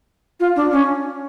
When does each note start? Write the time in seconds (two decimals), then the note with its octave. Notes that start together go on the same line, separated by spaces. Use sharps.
0.40 F4
0.56 D4
0.72 C#4